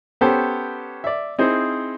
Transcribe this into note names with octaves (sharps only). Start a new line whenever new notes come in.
B3 C#4 G4 A4 C5
D5 E5
C4 D#4 E4 G#4 C5